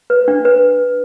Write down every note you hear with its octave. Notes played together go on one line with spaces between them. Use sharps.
B4
D4
B4